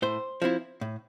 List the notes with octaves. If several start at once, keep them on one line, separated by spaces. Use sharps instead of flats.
A2 C5
F3 C4 E4
A2